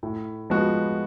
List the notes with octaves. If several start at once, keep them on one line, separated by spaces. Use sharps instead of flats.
A2
F3 G#3 B3 F#4